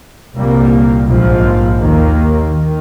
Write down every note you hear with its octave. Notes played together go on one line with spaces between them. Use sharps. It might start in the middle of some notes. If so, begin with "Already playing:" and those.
C2 A#2 G3 A#3
A#1 G#2 F3
D#2 D#3 A#3
D#3